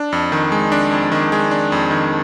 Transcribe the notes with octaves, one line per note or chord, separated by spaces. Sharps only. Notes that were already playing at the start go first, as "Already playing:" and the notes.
Already playing: D4
F2
D#3
G#3
D4
F2
D#3
G#3
D4
F2
D#3